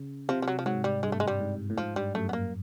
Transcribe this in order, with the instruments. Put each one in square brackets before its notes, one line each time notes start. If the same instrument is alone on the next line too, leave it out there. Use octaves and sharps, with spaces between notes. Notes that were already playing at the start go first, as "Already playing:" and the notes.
Already playing: [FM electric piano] C#3
[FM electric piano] C3 [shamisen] F3
[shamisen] F3
F#3
F3
[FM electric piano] G#2 [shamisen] F#3
[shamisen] G3
[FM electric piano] G2 [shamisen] G#3
[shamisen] A3
G#3
G3
[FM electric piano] G#2
A2
[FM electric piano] G#2 [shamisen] F3
[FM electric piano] G2 [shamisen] G3
[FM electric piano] F#2 [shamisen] A3
[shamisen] B3
A#3